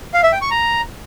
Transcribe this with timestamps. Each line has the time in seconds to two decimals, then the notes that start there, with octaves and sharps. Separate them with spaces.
0.14 F5
0.23 E5
0.32 G5
0.42 C#6
0.51 A#5